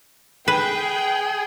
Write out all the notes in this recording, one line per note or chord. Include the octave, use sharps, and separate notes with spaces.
G#4 B4 G5